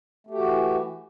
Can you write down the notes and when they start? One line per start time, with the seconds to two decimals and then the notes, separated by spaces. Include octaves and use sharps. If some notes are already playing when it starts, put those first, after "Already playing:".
0.27 A3
0.31 G4
0.34 F#4
0.38 E3